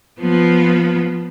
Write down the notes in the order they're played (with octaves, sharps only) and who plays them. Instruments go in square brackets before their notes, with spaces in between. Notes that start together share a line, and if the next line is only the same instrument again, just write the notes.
[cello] F3 B3